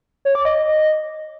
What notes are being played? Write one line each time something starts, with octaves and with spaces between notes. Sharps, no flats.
C#5
D6
D#5